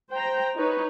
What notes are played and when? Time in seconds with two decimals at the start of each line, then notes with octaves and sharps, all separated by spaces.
0.13 C5 G5 A#5
0.56 D#4 B4 C#5